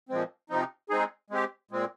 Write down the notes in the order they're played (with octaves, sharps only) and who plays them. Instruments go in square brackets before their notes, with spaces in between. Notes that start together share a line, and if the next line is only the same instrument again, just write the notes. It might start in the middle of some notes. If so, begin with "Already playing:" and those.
[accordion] A#2 F3 G#3 C4
C3 F3 C4 D#4
G#3 C4 D#4 G#4
G#3 C4 G4
A#2 G#3 C4